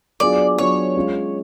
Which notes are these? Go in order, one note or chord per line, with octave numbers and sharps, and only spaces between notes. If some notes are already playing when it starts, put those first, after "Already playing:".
F#3 B3 D4 F4 G#4 D5
F#3 B3 D4 F4 G#4 C#5
G#3 C#4 F4